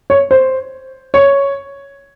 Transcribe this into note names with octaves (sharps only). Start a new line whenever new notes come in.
C#5
C5
C#5